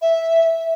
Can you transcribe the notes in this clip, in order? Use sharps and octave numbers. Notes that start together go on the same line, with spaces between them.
E5